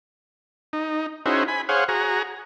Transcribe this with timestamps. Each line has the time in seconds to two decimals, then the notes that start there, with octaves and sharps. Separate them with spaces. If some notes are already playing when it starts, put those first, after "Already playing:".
0.73 D#4
1.26 C#4 D#4 E4 F#4 G#4 C5
1.48 G#5 B5
1.69 G#4 C5 C#5 F5 F#5
1.89 F#4 G#4 A#5